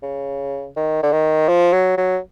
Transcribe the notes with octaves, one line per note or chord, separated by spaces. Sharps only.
C#3
D#3
D3
D#3
F3
F#3
F#3